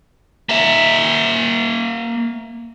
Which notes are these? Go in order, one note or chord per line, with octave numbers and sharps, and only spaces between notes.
A#3 E5